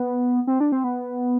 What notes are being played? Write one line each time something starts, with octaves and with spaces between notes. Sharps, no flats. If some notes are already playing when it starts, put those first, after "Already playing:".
Already playing: B3
C4
D4
C4
B3